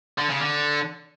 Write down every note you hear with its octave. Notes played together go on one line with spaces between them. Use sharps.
D3
C#3
D3